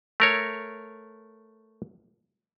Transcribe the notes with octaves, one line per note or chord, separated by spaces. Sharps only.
A3 A#4 C#5